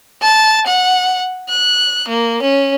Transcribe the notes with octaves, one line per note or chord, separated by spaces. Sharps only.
A5
F#5
F#6
A#3
C#4